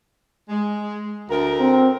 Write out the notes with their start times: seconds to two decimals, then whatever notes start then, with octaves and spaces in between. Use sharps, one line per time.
0.49 G#3
1.29 D2 A#4
1.60 C4